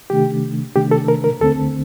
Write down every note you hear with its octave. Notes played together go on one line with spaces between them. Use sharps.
C3 D#3 A3 D4 G4
C3 D#3 A3 D4 G4
A4
A#4
A#4
D2 D3 A3 C4 A4